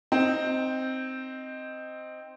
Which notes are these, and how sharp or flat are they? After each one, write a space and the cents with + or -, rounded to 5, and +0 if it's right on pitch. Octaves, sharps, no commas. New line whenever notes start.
C4 +0 D#4 +0